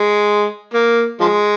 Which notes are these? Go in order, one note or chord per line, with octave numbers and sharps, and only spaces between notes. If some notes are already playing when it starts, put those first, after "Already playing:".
Already playing: G#3
A#3
F3 G#3